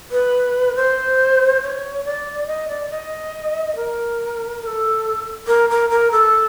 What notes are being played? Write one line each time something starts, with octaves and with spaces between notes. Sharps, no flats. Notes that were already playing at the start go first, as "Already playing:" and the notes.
B4
C5
C#5
D5
D#5
D5
D#5
A#4
A#4
A4
A#4
A#4
A#4
A4